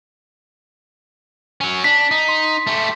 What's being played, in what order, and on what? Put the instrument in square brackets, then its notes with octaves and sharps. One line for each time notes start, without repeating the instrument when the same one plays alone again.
[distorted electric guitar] F#3 C#4
[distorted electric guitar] D4 [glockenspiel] B6
[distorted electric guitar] D#4
[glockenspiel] C6
[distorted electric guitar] A3 G4